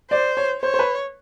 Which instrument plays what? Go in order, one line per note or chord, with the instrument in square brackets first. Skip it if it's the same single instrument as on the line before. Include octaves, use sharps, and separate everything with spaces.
[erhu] C5 [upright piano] D5
[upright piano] C#5
[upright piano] C5 [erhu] C#5
[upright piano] C5
B4